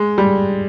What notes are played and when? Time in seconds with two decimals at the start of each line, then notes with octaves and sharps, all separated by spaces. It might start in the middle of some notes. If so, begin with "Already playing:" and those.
Already playing: G#3
0.18 G3